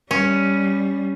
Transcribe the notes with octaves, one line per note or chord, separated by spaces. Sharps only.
G3 C#4